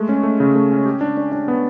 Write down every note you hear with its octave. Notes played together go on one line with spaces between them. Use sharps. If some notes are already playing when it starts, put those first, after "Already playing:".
Already playing: G#3 A3
C#4
A3
C#3
A3
C#4
G4
D4
D4
D4
B3